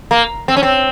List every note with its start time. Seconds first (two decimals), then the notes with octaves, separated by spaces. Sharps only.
0.11 A#3
0.48 C4
0.57 C#4
0.63 C4